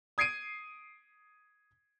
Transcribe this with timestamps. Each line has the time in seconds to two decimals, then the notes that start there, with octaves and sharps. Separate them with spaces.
0.18 D#6 G#6 C7 D7 D#7